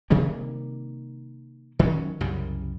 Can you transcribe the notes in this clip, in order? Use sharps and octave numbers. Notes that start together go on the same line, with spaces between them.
C3 D#3 G3 A#3
D#3 F#3 C#4
C2 F#2 C#3 G3